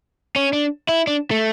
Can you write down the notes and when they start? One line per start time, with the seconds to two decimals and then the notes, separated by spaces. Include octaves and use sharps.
0.36 C#4
0.53 D4
0.89 E4
1.07 D4
1.31 A3